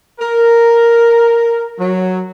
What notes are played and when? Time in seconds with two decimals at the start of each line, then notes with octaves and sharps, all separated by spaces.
0.20 A#4
1.79 F#3